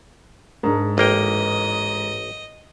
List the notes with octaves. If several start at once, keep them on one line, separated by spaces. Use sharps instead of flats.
G#2 G#3 D4 A#4
A1 A#3 D#5 G5